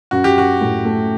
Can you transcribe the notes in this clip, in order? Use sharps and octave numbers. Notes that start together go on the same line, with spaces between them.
F#2 F#4
G4
F#2 F#4
A2
A3